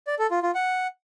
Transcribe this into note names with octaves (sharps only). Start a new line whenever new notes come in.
D5
A4
F4
F4
F#5